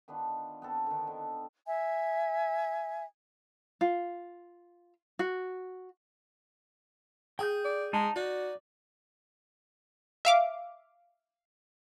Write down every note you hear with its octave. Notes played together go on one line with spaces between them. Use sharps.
D#3 B3 D4 F4
B3 C4 A4
D3 D#3
D3
E5 G#5
F4
F#4
G#4 G5 D#6 G6
D5
G#3 D#4 A5
D#4 F#4 D5
E5 F5 D6